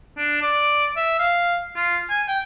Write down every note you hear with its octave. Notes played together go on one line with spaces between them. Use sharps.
D4
D5
E5
F5
F4
G#5
G5